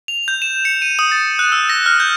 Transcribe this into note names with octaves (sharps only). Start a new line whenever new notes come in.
F7
G6
E7
C#7
D#7
D#6
A6
F#6
E6
A#6
F6
G6